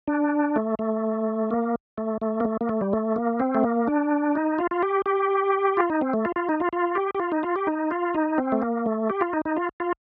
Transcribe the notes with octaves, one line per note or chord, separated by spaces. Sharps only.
D4
A3
A3
A#3
A3
A3
A#3
A3
A#3
A3
G3
A3
A#3
C4
A3
A#3
D4
D#4
F4
F4
G4
G4
F4
D#4
C4
A3
F4
F4
D#4
F4
F4
G4
G4
F4
D#4
F4
G4
D#4
F4
D#4
C4
A3
A#3
A3
G4
F4
D#4
D#4
F4
F4